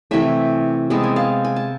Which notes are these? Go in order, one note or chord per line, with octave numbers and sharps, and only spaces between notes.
C3 E3 A3 E5 G#5
C3 G#3 B3 A5
G#5
F5 A5
G#5
A5